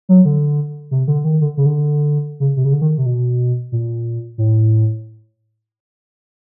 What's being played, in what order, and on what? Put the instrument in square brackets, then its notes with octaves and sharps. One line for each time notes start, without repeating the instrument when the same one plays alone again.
[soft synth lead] F#3
D3
C3
D3
D#3
D3
C#3
D3
C#3
C3
C#3
D3
D#3
C3
B2
A#2
A2